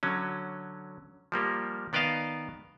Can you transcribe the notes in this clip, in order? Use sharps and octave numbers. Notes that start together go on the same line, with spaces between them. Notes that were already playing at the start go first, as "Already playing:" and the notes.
D3 F#3 C#4
F3 G3 A#3 G4
D#3 B3 D5 D#5 F5 A5